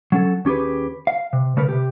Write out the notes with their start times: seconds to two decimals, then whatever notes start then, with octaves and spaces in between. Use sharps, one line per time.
0.12 F#3 C#4 A4
0.45 D#2 C#4 G4 G#4 B4
1.07 F5
1.33 C3
1.57 C#3 A3 A#4 B4
1.68 C3 G4